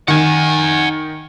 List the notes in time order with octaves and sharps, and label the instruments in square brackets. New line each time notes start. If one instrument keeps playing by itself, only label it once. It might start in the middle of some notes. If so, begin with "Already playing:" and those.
[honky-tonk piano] D#3 [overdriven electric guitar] F#5 G#5